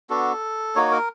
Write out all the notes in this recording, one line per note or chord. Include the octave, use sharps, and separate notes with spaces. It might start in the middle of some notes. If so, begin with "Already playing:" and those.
B3 D4 F#4 A4
A#3 D#4 F#4 C#5
A#4